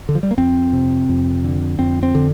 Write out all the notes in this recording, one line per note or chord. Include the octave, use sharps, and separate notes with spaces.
D3
F3
G3
A#3
F2 C4
C3
F2
D3
F2 C4
C4
D3